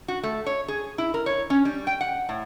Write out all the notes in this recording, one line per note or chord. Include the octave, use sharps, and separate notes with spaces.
F#4
A3
C#5
G#4
E4
A#4
C#5
C#4
G3
G5
F#5
A2